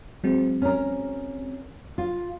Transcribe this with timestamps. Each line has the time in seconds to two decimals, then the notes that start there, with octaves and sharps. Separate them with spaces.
0.24 F#3 G#3 C4
0.62 C#4 A#4
1.98 F4